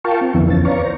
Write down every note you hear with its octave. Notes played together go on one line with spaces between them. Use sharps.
F4 A#4 F5 G5 A5 C#6
C4
F2 D3 E3 F3 B3 E4
F2 C#4 A6
B4 C#5 D5 F5 A#5 C#6
C5 A#5